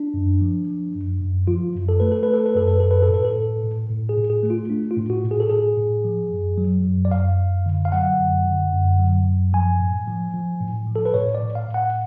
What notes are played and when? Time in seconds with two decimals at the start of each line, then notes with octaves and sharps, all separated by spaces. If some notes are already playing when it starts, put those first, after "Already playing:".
Already playing: D4
0.14 F#2
0.41 F3
0.67 F3
0.95 F#2
1.21 F#2
1.47 F3 F4
1.75 F#2
1.89 A4
2.00 A3 B4
2.12 A4
2.23 B4
2.28 A3
2.34 A4
2.46 B4
2.55 F#2 A4
2.68 B4
2.80 F#2 A4
2.91 B4
3.02 A4
3.09 A2
3.14 B4
3.25 A4
3.36 A2
3.63 A2
3.89 A2
4.09 G#4
4.17 A2
4.30 G#4
4.43 A3
4.50 F4
4.70 A3 D4
4.91 F4
4.97 A2
5.10 F#4
5.24 A2
5.31 G#4
5.40 A4
5.50 A2 G#4
5.77 A2
6.05 F3
6.31 F#2
6.58 F#3
6.85 F#2
7.05 D5
7.11 F#2 F5
7.38 F#2
7.66 D3
7.85 F5
7.92 F#3 F#5
8.19 F#2
8.46 D3
8.72 F#2
8.99 F#3
9.27 F#2
9.53 F3 G#5
9.80 A2
10.08 F3
10.34 F3
10.61 A2
10.87 F3
10.96 A4
11.05 B4
11.14 A2 C#5
11.35 D5
11.42 A2
11.55 F5
11.68 A2
11.74 F#5